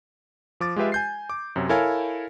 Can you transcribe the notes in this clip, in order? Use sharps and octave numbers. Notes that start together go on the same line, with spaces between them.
F3 D6 A6
G#3 F4 G4 B4 E5
G#5 G6 C7
D6
F#2 C3 F#3
E4 A4 A#4 C#5 F5 G#5